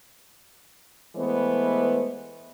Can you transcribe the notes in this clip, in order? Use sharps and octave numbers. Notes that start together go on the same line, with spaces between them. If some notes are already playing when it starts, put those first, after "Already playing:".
E3 G#3 A3 B3 B4 C5